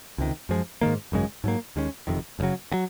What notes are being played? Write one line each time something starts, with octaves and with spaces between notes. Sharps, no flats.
C#2 C3 D#3
F#2 F3 G#3
G#2 D#3 A#3
G#1 F#2 C#3 G#3
G#2 F#3 A#3
D#2 D#3 G#3 C#4
F#1 F2 C3 D#3
F#1 F#2 C#3 F#3
C#3 F#3